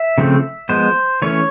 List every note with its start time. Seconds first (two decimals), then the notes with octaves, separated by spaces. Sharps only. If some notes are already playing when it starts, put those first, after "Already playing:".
Already playing: E5
0.18 C#3 F3 A3 C4
0.69 F3 G#3 B3 C5
1.22 E3 A3 C#4 C#5